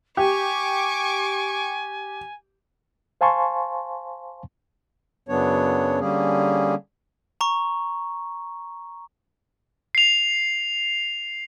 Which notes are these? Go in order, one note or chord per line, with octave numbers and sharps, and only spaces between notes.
G4 G#5 C#6 D6
C5 F5 G#5 A5 C6 C#6
F#2 C#3 F#3 B3 D4 C#5
D3 G3 A#3 C#4 G#4
A#5 C#6
C7 F7